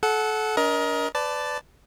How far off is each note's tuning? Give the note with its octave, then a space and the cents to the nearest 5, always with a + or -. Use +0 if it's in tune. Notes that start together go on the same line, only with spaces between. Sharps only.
A4 -25 F#5 +0
D4 -40 A#4 +25 D#5 +20
B4 +30 D5 +0 A5 +0